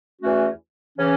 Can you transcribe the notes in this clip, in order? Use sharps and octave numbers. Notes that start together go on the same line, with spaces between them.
E2 E3 A3 C#4 F#4
C#3 E3 C#4